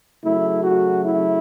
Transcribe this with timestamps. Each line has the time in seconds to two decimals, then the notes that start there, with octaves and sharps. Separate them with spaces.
0.24 C#3 F#3 A3 E4
0.63 F#4
1.03 E4